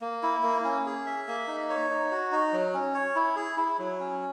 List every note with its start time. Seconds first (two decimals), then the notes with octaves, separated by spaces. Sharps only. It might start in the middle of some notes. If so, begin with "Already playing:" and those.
0.01 A#3
0.23 E4
0.43 A#3
0.64 C#4
0.86 G#4
1.06 E5
1.28 A#3
1.48 D#4
1.70 C#5
1.90 D#4
2.11 F#4
2.32 D#4
2.53 F#3
2.74 C#4
2.94 C#5
3.16 E4
3.36 G#4
3.57 E4
3.79 F#3
4.00 C#4